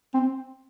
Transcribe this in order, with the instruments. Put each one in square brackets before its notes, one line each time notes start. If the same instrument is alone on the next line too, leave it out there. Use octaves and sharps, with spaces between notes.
[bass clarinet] C4